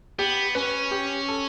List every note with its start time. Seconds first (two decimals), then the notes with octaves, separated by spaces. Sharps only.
0.19 B3 G4
0.55 C#4 B4
0.91 G4
1.28 A4